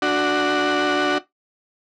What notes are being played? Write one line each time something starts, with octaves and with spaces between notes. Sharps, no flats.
D4 F#4